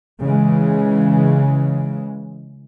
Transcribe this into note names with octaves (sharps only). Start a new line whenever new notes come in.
C#3 E3 G#3